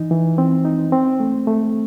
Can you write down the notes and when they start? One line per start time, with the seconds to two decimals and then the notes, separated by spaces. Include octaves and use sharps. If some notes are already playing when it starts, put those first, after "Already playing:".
Already playing: E3 D#4
0.11 E3
0.38 C4
0.65 D#4
0.92 C4
1.20 A3
1.47 A3